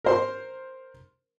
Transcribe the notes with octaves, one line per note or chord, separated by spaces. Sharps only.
A#4 C5 C6